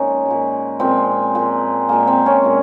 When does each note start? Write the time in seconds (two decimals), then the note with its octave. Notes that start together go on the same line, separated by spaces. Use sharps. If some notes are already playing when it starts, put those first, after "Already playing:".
Already playing: A#2 F3 G#3 C#4 D#4
0.26 A#2 G#3
0.80 A#2 F3 G#3 C4
1.35 A#2 G#3
1.89 A#2 G#3 A#3
2.07 C4
2.26 C#4
2.44 A#2 G#3